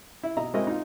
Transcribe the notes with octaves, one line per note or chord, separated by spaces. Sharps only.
E4
B2 D#5 E5 A#5
G#3 C4 E4 F#4 A#4 D#5
D#4 F4